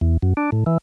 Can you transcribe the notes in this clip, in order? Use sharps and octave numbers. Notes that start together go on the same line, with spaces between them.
E2
F#2
D4
A2
E3